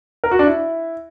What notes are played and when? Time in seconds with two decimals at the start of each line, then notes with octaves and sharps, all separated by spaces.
0.24 A#4
0.31 F#4
0.39 D4
0.47 E4